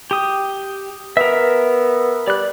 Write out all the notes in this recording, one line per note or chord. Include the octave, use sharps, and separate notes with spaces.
G4 D#6
B3 A#4 E5
G3 D5 F#6